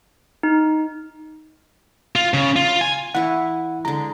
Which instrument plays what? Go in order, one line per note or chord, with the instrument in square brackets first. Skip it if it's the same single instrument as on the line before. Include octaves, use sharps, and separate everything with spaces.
[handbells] D#4
[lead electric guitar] F4
C#3
F4
G#5
[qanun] E3 E4 C#6 [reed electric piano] F#5
[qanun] D3 G#3 [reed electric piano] A#5